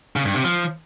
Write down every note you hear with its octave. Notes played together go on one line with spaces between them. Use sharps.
C#3
G2
C3
F3